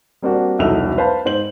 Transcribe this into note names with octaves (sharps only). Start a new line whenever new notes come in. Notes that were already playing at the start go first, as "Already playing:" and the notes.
G3 A#3 C4 D4 F#4
E1 C2 F#3 D#4 A4 F7
B4 C5 F5 A5 B5
G#2 C5 F#7